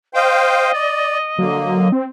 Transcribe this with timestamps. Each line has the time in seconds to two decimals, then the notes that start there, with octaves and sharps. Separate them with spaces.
0.14 C5 D#5 F5 G5
0.73 D5
1.39 D3 F#3 A#3
1.92 C4